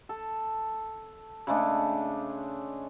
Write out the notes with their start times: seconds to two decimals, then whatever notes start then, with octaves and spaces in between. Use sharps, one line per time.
0.09 A4
1.47 C#3 G#3 A3 D4